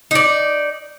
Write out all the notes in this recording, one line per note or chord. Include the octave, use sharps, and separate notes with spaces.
D#4 D5